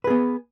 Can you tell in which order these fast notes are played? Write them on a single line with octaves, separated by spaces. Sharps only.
B4 G#4 B3